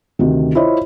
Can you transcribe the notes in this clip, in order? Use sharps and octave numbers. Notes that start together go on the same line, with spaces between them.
D2 C3 D#3
E4 F4 C5 C#5 D#5